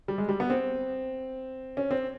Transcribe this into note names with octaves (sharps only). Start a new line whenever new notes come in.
G3
G#3
G3
B3
C4
C#4
C4